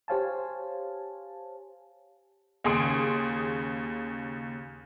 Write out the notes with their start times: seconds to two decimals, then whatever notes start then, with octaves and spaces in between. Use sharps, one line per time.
0.08 G4 C5 C#5 F5 G#5 A5
2.64 D#2 C#3 G#4 C6 D#6 D7